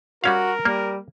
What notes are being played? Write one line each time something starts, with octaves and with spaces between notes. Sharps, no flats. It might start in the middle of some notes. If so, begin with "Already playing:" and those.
G3 C#4 F#4 A#4 F5
G3 A#3